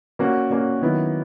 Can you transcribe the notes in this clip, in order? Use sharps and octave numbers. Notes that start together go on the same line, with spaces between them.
G3 A#3 C#4 F#4
G3 A#3 C#4 F#4
D#3 F#3 B3 E4